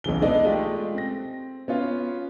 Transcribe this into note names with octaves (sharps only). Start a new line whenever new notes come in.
B1 C#3 E3 G7
G#3 B3 D#4 A4 D5 D#5
G#3 A3 F4 G4
C4 A#6
B3 C#4 F4